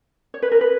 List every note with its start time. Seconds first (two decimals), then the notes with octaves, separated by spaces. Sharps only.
0.34 C#5
0.42 B4
0.52 A#4
0.61 B4